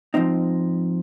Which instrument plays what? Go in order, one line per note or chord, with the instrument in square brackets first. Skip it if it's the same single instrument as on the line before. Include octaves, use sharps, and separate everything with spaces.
[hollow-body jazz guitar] G#2 F3 C4 D#4